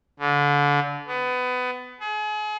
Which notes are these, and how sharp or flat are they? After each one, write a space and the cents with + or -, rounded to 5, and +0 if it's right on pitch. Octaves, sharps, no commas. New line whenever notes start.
D3 -30
B3 +25
G#4 +35